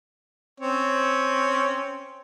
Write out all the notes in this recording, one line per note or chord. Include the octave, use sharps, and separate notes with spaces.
C4 C#4 C#5